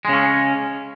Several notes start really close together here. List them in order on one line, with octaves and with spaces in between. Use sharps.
G#3 C#3 C#4